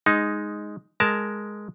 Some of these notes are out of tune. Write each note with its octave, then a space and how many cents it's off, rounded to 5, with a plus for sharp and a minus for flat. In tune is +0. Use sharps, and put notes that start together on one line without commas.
G#3 +0 D#4 +0
G#3 +0 A#4 +0 A5 +0